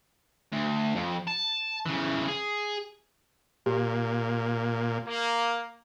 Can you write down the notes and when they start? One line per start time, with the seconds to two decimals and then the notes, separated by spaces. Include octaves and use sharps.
0.53 D2
0.95 F2
1.27 A5
1.86 C#3 E3
2.28 G#4
3.66 A#2 G4
5.07 A#3